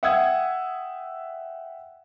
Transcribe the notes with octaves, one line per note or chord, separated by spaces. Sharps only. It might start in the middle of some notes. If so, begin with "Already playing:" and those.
E5 F#5 G5 D#6 E6 G#6